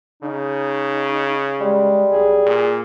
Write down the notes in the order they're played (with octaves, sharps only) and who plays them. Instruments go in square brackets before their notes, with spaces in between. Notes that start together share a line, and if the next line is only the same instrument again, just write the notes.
[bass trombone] C#3 [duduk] D#4
[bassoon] G3 [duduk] G#3
[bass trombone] B1 [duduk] G#4
[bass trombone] A#2